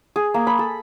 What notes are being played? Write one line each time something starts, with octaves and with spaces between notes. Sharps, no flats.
G#4
A#3
B5
A4